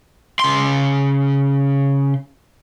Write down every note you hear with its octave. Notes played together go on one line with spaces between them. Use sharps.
C#3 C6